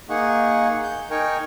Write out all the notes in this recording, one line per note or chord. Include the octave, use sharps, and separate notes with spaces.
A#3 D#4 G#4 F#5 C#6
G6
D#4 A#4 G5 G#5 C#6